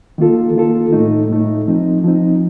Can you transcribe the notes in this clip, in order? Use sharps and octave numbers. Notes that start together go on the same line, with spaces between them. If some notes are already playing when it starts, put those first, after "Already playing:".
D#3 A#3 F4 A4
D#3 A#3 F4 A4
A2 A3 D#4
A2 A3 D#4
F3 C4 D#4
F3 C4 D#4